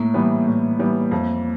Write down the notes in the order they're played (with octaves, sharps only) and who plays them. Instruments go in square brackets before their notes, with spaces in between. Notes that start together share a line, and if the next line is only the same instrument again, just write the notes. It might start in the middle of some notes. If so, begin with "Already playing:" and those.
Already playing: [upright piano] A2 [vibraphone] A#3
[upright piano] E3 G3 B3
A2
E3 G3 B3
F2